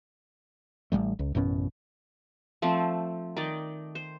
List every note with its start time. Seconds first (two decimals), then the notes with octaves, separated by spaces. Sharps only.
0.92 A1 E3 G3 A3
1.19 C#2
1.35 A1 F#2 B2 C#4
2.62 F3 A3 C4
3.37 D#3 D#4 D5
3.95 C5